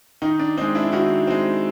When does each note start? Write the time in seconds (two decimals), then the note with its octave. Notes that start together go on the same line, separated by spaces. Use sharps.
0.22 D#3 D#4
0.39 D4
0.57 G#3 C4 D#4
0.75 D4 E4
0.92 D#3 E4 F#4
1.27 G#3 C4